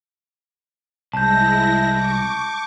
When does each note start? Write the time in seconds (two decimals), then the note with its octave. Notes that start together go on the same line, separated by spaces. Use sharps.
1.14 C2 G#3 E4 A5 G6 A#6
1.90 C#6 D6